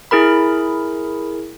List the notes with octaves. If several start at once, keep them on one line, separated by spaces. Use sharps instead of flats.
E4 G#4 A#4 B5